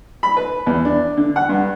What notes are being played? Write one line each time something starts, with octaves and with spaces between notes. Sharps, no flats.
B5
B4
E2
D4
D3
F#5
G2